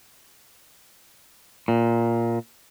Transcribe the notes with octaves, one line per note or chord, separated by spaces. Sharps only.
A#2